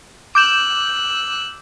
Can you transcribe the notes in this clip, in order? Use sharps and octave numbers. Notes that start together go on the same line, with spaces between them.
D6 E6 F#6 G6 E7